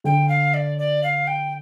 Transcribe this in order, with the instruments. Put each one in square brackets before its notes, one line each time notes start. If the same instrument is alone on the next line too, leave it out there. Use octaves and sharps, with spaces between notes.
[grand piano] D3 [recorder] G5
[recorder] F5
D5
D5
F5
G5